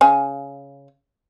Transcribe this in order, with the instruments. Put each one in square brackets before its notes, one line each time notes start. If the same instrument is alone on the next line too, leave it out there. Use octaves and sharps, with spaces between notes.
[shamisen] C#3 G#5